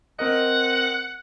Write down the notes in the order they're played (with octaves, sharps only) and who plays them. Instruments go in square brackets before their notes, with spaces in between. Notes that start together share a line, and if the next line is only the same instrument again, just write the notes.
[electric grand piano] C4 A#4 D#5 [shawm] F#5